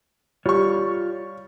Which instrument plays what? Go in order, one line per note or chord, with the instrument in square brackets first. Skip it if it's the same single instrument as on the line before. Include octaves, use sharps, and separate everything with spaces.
[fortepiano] G3 C#6 [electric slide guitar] F4 C#5